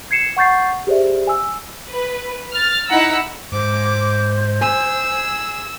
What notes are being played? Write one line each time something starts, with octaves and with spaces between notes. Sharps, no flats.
G#6 C7 C#7 E7
F#5 C#6 G6 A6 C7
G4 G#4 C5 D5 E5
G#5 E6
B4
F6 A6
D#4 E4 F#5 A#5 E6
G#2 C5 D6
G#4 G#5 E6